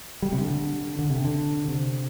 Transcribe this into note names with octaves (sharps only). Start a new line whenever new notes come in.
G3
C3
D3
D3
C3
D3
C3